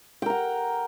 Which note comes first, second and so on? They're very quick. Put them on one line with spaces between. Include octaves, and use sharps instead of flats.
G5 A#4 F#5